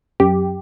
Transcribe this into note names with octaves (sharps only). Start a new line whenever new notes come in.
F#2 G4